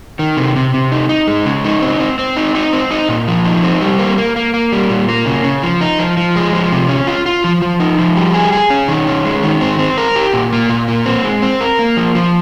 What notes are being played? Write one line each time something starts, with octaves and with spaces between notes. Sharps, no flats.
D#3
C3
C3
C3
D#4
D#4
G#3
C#3
D#4
C4
C4
C4
D#4
D#4
C4
D#4
A#2
F3
D#4
C4
G3
A#3
A#3
A#3
A#3
G3
A#2
A#3
C#3
C#3
F3
D#4
F3
F3
G#3
F3
C3
C#4
F4
F4
F3
F3
D#4
F3
G3
G#4
G#4
C#4
D#3
C#4
G#3
D#3
C4
C4
A#4
G4
A#2
A#3
A#2
A#3
C4
G#3
C4
A#4
A#3
F3
F3